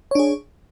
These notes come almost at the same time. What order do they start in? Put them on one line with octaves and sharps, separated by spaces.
C#5 D4 G#4